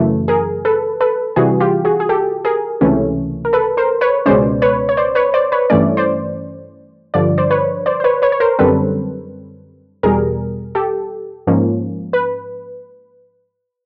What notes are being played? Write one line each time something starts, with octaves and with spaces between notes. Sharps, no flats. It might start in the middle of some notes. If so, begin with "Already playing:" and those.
Already playing: F#2 C#3 E3 A3
G#4 A#4
A4 B4
A4 B4
C3 E3 G3 F#4 G#4
F4 G4
F#4 G#4
G#4
G4 A4
G#4 A#4
C#2 C3 E3 A3 C#4
A#4
A4 B4
A#4 C5
B4 C#5
C#2 B2 G#3 C#4 C5 D5
B4 C#5
C#5
C5 D5
B4 C#5
C5 D5
B4 C#5
G2 E3 A3 C#4 D5
C5 D5
G2 D3 F3 D5
C5 D5
B4 C#5
C5 D5
C5
B4 C#5
B4 C#5
C#5
A#4 C5
F#2 D3 G3 C4 A4 B4
E2 B2 G3 G#4 A#4
G4 A4
G#2 F3 A#3 C#4
B4